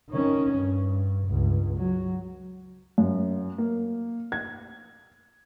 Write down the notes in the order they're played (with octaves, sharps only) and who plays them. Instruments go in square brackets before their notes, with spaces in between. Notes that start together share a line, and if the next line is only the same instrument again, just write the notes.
[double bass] D#3 C#4
G2
C#2 G2
F#3
[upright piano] F#2
A#3
G#6